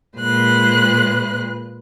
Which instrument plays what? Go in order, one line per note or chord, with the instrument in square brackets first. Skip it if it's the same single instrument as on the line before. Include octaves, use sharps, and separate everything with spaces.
[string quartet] A#2 G#3 B4 C5 F#6